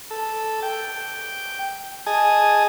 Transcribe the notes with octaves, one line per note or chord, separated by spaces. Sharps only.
A4
G5
G#4 D#5 G#5 A5